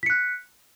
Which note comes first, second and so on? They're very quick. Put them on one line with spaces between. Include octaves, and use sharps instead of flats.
B6 C#7 F#6